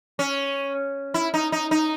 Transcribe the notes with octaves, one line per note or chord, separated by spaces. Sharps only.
C#4
E4
D#4
D#4
D#4